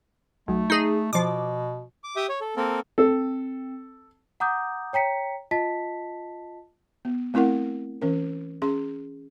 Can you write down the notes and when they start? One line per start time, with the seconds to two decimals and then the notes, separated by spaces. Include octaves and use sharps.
0.48 B1 A3
0.70 D#4 G#4
1.13 B2 F3 D6
2.04 D6
2.16 G4 E5 G5 D#6
2.29 C#5
2.41 A4
2.56 A#3 C4 A4 A#4
2.98 C4 A4
4.40 F#5 A#5 D6 D#6 G6
4.93 C#5 G5 A#5 B6 C#7
5.51 F4 D#5 A5 B6
7.05 B3
7.34 A3 C4 E4 A#4 F#5
8.02 E3 C#4 A#4
8.62 C#4 G#4 C6